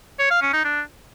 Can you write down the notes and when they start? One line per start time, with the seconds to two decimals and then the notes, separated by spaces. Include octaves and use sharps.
0.19 C#5
0.30 F5
0.42 C#4
0.53 D#4
0.64 D4